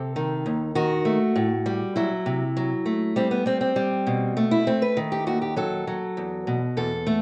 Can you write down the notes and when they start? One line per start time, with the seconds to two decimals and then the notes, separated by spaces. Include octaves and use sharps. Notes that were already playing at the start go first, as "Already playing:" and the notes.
Already playing: C3 A4
0.16 D#3
0.46 D#2
0.75 D#3 F#4
1.05 A3
1.36 A2
1.66 G3
1.96 F#3 E4
2.26 C3
2.57 F#3
2.86 A3
3.16 G3 C4
3.31 B3
3.46 G3 C4
3.61 C4
3.76 G3
4.07 B2
4.37 A3
4.51 E4
4.67 A3 C4
4.82 B4
4.97 D#3
5.12 G4
5.27 D#2 F#4
5.42 G4
5.56 F#3 A4
5.87 F#3
6.17 E2
6.47 B2
6.77 E2 A4
7.07 A3